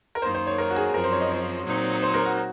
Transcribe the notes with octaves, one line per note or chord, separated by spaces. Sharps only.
A#4
F#2 D#3 A#3 C5
C5
C#5
A#4
F#4
G#4
F#2 F3 C4 A#4
C5
C#5
D#5
C#5
A#2 F#3 C4 D#4
C5
A#4
F#4